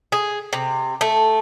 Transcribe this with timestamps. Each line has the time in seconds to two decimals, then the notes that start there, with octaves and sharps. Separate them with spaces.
0.12 G#4
0.53 C3
1.01 A3